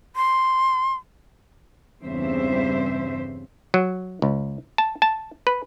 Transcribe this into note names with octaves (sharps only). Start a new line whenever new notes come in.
C6
E2 G2 C#3 C4 C5 E5
F#3
C#2
A5
A5
B4